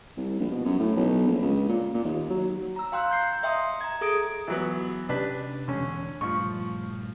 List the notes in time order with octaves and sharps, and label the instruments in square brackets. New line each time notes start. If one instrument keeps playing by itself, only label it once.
[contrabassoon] C2
A#1
B2
F#2
A2
B1
A#1
C#2
A#2
A#2
D#2
F#3
[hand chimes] A#5 E6
F5 G5 C6 E6 F#6
A#5 G6 C7
D#5 E5 G5 C6 D#6
A#5 G#6
G#4 A4 D#6 D7
[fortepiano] E3 F#3 B3
[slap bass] C3 C#4 [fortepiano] D4 G4 B4
[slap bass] E1 [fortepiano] D3 C#4
[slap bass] A#1 G2 A3 [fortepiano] F3 C#6